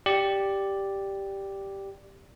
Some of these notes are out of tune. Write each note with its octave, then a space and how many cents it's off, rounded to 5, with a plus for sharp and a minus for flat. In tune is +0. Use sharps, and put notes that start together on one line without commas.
G4 +0 D5 +0